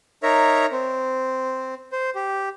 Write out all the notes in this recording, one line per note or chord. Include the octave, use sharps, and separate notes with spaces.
D#4 A#4 C#5 E5 A#5
C4
C5
G4